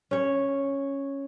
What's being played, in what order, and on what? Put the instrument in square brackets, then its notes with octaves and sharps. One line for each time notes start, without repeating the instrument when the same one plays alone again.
[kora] C#4 C#5